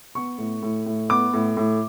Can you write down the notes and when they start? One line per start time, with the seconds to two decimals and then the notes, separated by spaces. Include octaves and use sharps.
0.15 B3 C#6
0.38 A2
0.63 A2
0.86 A2
1.09 B3 D6
1.33 A2
1.57 A2